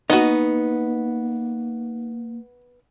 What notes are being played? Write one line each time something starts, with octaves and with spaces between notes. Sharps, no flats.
A#3 B3 D#4 F#4 D#5